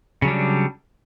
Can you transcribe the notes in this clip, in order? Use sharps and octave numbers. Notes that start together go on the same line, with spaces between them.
C#3 F#3 G3 D4